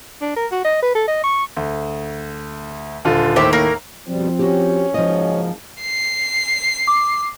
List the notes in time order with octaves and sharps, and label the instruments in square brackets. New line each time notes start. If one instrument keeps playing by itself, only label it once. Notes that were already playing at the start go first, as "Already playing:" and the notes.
[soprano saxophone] D4
A#4
F#4
D#5
B4
A4
D#5
C#6
[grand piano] D2
D#1 D3 F4
[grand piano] D#2 A2 [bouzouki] G4 C5 E5
[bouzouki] A#3 A#4
[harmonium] F2 B2 G3 [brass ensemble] F3 C4
[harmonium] C#4 [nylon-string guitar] F#4 G4
[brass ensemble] F#1 G#2 [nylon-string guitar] F3 D#5
[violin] C7
[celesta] D6